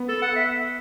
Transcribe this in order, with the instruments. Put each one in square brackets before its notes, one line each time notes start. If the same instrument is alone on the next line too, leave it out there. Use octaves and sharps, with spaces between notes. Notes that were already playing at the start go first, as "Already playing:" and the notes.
Already playing: [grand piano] B3
[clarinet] A4
F#5
E5